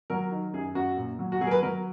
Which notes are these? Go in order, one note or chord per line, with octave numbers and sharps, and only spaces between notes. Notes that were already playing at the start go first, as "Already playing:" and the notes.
F#3 A#4
D#3
F#2 G#4
F#2 F#4
A#2
F#3
F#4
F#3 G#4
A#4
B4
F#3 A#4